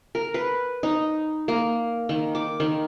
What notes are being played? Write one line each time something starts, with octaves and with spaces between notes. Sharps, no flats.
A#4
B4
D#4
A#3
D#3
D6
D#3